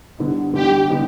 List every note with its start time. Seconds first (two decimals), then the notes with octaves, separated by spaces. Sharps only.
0.19 D3 G3 B3 D#4
0.54 D3 G3 B3 D#4 G4
0.89 D3 G3 B3 D#4